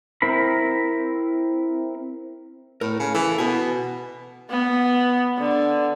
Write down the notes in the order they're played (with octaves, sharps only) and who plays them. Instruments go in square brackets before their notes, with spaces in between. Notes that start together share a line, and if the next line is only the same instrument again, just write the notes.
[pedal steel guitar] C4 E4 A#4 B5
[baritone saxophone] A2 [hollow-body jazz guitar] A#4
[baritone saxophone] C#3
[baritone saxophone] E3 [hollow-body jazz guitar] A4
[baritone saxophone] B2 [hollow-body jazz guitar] B3 G#5
[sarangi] B3
D3